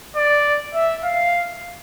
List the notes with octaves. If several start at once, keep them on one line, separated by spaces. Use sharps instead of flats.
D5
E5
F5